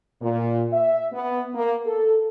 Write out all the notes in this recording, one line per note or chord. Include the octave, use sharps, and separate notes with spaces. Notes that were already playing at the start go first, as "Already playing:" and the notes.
A#2
E5
B3
A#3
A4